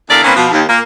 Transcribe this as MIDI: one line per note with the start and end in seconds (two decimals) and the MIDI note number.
0.10 0.21 40
0.10 0.21 50
0.10 0.21 70
0.10 0.21 74
0.10 0.21 76
0.10 0.21 77
0.24 0.32 51
0.24 0.32 58
0.24 0.32 60
0.24 0.32 61
0.24 0.32 71
0.36 0.48 47
0.36 0.48 53
0.51 0.62 39
0.68 0.80 46
0.68 0.80 58